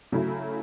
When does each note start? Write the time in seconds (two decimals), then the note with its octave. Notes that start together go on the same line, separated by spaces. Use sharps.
0.12 C#3 F#3 A3 E4